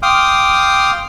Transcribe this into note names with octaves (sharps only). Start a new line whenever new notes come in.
F5 G5 C6 D6 D#6 F6